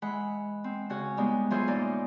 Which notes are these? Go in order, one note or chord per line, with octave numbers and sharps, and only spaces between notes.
E3 G#3 F#5 B5
C4
C#3 F#4 C#5
G3 G#3 B3 D#4
E3 F#3 F4 G#4 C5 C#5
G#2 B2 A#3 D#4 D5